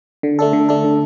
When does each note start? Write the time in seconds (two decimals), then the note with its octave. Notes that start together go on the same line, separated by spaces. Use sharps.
0.23 D3
0.39 A3 D4 A4
0.53 D3
0.69 A3 D4 A4
0.84 D3